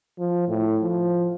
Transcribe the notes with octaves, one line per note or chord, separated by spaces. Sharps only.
F3
A2
F3